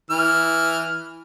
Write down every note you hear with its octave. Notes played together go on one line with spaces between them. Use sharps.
E3 F6